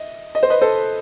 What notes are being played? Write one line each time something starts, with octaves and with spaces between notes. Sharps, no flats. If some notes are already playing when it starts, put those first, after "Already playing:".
Already playing: D#5 E5
D#5
C5
B4 D#5
A4 C5